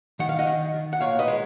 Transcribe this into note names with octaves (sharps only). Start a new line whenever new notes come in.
D#3 F#5
F5
D#5 F#5
D#3
D#3
F#5
A#2 C#5 F5
B4 D#5
G#3